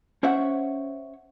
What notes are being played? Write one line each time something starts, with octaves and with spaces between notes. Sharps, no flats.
C#4 C5 C#5 E5 F#5